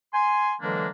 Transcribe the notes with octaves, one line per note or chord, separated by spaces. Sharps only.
G#5 C6
D3 E3 F#3 G#3 A#3 D4